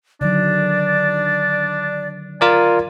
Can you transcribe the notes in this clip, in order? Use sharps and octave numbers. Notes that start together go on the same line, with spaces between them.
D3 D#3 F#3 D4 D5
F4 A#4 D5 G#5